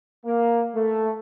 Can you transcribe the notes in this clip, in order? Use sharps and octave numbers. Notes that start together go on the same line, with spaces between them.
A#3
A3